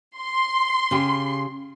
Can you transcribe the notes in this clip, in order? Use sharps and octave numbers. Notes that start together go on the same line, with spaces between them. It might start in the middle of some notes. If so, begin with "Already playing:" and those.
C6
C#3 G4